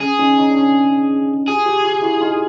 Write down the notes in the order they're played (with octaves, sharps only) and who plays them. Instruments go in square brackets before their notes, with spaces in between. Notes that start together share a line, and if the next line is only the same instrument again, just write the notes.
[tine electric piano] C#4 [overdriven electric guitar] G#4
[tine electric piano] C#4 D#4
C#4 D#4
D4
C#4
[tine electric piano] F4 G4 [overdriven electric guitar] G#4
[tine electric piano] F4 G4
F4 G4
E4 F#4
D#4 F4